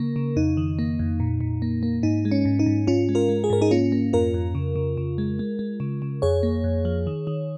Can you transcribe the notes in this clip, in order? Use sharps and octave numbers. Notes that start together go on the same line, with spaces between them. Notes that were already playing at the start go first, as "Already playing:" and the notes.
Already playing: C#3 A#3 A#4
C#3
F2 D#4
D#3
A#3
F2
A#2
A#2
A#3
A#3
G#2 D#4
G#3
C#4
G#2
D#4
G#2
G#2 C#4 F4
G#3
F4 A#4
G#3
G#4
G#2 A#4
D#4 G#4
A#3 C#4 F4
A#3
F2 F4 A#4
F2
C#3
C#3
C#3
G#3
G#3
G#3
C#3
C#3
F2 G#4 C#5
A#3
F2
F3
D#3
D#3